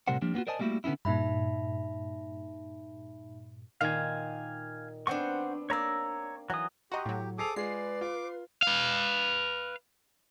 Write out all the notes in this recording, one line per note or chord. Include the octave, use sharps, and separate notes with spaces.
A2 C3 G3 A#4 C5 F#5
F3 G3 A#3 D4
A#3 B3 C#4 F4 F#4
A#4 C5 D5 D#5 G#5 A5
G3 A3 A#3 E4 F#4
D3 B3 C#4 D#4 E4
G2 A#2 D#4 E5 B5
A#2 D#3 F5 G#5
B3 C4 D4 C5 F#5 C#6
A#3 C#5 D5 A#5 E6
E3 F#3 D#6
F#4 G4 D#5 A#5 C6 C#6
A2 F#3
G#4 A4 C5 D6 D#6 C7 F7
G#3 F4 G#4 B4 D5 C7
F4 D6
B4 F5